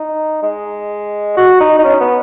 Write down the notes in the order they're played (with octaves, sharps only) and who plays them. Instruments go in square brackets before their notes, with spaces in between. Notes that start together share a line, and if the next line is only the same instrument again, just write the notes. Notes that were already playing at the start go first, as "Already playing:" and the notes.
Already playing: [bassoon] D#4
G#3
F#4
D#4
D#4
C#4
B3